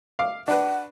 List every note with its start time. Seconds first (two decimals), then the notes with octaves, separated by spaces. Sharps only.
0.19 F5 D6
0.48 D4 B4 F#5